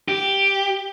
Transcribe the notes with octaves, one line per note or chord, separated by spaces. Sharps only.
G4